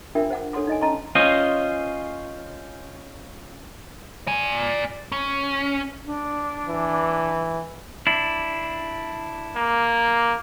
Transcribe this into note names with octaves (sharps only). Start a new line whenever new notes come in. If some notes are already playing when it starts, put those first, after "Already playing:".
D4 F4 A#4 E5 G5
C5 F#5 D6
D4 A4 C#5 F#5 C6 D6
D#4 D#5 G#5
C#4 D#5 A5 A#5 C6 C#6
C#4 F4 C5 D#5
D5 G#5
C#4
D4
E3
D4 E4
A#3